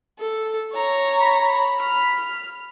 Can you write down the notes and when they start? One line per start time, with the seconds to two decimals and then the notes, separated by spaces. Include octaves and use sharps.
0.19 A4
0.74 C#5 A#5
1.21 B5
1.80 F6